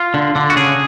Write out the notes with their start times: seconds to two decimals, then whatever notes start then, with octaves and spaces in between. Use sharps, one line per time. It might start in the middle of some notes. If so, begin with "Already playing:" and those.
Already playing: F4
0.14 D3
0.36 D3
0.50 F#4
0.56 C#3 G#4